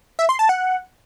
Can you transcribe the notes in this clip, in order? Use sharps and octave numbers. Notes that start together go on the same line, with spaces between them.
E5
C6
A5
F#5